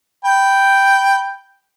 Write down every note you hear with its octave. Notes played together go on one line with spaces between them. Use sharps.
G5 B5